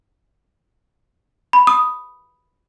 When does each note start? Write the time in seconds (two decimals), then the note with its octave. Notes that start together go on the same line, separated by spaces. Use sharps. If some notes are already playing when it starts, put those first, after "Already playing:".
1.53 B5
1.67 D#6